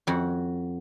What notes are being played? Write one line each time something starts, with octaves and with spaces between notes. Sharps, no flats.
F2 F#4